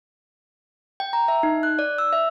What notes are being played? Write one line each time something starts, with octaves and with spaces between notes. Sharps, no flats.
G5
A#5
E5
D#4
F#6
D5
E6
E5